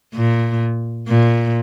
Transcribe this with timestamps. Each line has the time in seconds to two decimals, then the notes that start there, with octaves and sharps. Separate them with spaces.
0.14 A#2
1.08 A#2